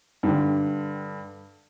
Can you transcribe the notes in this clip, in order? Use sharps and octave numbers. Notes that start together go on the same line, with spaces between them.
G2 D3